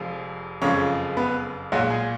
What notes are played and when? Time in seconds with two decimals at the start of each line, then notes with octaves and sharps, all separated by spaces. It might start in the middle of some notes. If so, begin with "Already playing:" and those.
Already playing: F1 F2 F3 G#3
0.62 F#1 F2 F3 G#3 C#4 C#5
1.17 B3 B4
1.72 B1 A#2 F#3 G#3 F#4
1.90 G#3 G#4